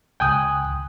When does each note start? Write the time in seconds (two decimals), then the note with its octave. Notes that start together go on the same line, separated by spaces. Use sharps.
0.20 C#2 G5 G#5 D#6 F#6